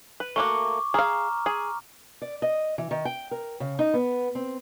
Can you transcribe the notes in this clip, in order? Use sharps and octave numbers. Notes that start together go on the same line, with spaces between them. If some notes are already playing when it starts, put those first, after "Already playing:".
B4
A3 A#3 F#4 C#6 D6
G#4 F5 A#5 F6
G#4
D5
D#5
E3
D#3
G5
A#4
C#3
D#4
B3
C4